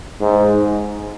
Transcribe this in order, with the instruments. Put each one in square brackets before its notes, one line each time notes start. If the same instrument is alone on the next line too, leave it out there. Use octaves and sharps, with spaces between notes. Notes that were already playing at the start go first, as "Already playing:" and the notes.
[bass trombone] G#2